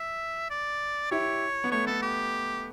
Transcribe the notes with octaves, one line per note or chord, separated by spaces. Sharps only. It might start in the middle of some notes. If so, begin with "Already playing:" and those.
Already playing: E5
D5
E4 G4 C#5
B3
A3 C#5
B3 A4
G4